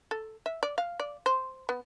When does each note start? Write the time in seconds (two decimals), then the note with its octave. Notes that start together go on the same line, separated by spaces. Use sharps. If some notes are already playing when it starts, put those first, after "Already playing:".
0.11 A4
0.46 E5
0.63 D5
0.78 F5
1.00 D5
1.26 C5
1.69 B3